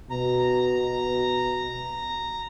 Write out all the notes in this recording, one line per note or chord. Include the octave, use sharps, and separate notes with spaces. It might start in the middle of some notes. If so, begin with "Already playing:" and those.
B2 A#5